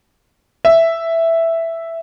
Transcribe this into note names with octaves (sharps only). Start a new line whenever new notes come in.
E5